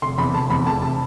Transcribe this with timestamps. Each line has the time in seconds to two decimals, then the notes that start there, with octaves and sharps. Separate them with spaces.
0.02 F1 C6
0.18 E2 C3 B5
0.34 F1 A5
0.50 E2 C3 B5
0.66 F1 A5
0.82 C3 A5